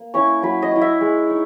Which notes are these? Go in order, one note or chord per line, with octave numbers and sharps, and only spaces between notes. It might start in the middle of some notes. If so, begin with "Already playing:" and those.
Already playing: A#3
C#4 E4 C#6
F#3 B5
D#5
C#4 E4
E5
G#3
D#4